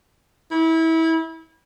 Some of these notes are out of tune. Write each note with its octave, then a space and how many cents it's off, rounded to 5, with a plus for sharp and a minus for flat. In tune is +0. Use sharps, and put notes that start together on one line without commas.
E4 -25